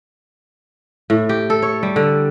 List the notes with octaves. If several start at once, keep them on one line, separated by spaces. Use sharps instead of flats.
A2
G4
A4
C#5
G3
D3